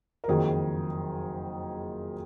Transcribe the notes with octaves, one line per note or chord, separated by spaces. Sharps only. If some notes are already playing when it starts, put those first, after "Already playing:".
A#4
F#1 F2 D#3 F#3 G#4